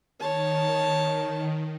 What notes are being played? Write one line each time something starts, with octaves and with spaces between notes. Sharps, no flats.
D#3 C#5 A5